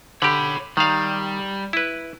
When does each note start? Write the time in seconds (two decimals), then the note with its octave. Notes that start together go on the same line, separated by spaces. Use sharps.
0.22 D3 G4 C#5 B5
0.77 D#3 G3 F5
1.73 E4 B4